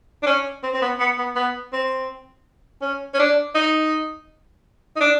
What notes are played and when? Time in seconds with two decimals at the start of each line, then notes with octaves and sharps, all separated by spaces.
0.23 D4
0.26 C#4
0.63 C4
0.74 C4
0.82 B3
1.00 B3
1.18 B3
1.36 B3
1.73 C4
2.82 C#4
3.14 C#4
3.19 D4
3.55 D#4
4.96 D#4
5.00 D4